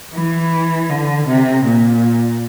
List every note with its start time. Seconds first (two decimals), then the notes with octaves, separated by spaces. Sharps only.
0.14 E3
0.90 D3
1.27 C3
1.65 A#2